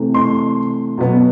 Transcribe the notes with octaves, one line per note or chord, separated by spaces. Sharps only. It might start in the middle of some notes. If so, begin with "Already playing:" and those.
Already playing: C3 E3 A3
C6
B2 F#3 B3